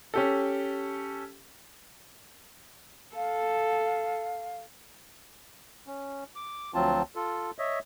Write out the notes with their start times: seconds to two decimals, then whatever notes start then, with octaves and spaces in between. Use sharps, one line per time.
0.14 C#4 G4 A4
3.16 A4 F5
5.87 C#4
6.36 D6
6.74 D2 F3 F#3 C4 F4 A5
7.15 F4 A4
7.59 C#5 D#5 E5